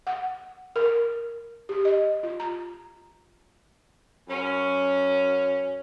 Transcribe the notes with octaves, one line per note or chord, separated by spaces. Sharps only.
F#5
A#4
G4
D#5
F4
A#5
F#2 C#4